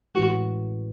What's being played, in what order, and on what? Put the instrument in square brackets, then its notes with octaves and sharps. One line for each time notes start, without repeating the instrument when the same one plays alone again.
[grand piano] A1 A2 E3 G#3 [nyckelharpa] F#4